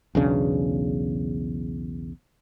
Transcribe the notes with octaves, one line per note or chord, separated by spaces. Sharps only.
B1 E2 C#3 D4